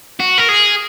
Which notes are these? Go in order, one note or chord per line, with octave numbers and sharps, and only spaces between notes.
F#4
A#4
G#4